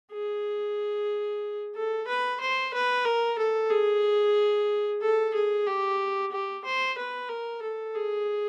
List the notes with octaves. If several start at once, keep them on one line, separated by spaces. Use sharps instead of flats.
G#4
A4
B4
C5
B4
A#4
A4
G#4
A4
G#4
G4
G4
C5
B4
A#4
A4
G#4